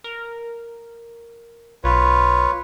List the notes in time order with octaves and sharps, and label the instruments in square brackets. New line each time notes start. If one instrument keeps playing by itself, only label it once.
[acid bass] A#4
[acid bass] B1 [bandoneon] F4 B4 C#5